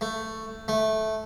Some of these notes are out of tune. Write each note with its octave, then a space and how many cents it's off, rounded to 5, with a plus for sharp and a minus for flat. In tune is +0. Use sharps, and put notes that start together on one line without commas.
A3 +10
A3 -10